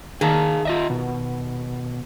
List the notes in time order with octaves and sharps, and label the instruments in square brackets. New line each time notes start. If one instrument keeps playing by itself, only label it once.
[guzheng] D#3 [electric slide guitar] G#4 F5 A5
[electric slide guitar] F4 D#5 E5
B2